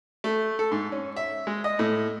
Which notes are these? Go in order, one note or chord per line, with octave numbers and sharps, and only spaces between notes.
A3
A4
G#2
C#4
E5
G#3
D#5
A2